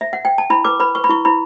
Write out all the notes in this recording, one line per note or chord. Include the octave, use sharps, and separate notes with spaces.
E5
F#5
G5
A5
E4 B5
B4 D6
B4 B5
B4 C#6
B5
E4 C#6
E4 B5